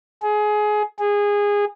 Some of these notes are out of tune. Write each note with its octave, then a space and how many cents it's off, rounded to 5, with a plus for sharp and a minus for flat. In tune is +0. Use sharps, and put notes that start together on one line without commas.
G#4 +20
G#4 -20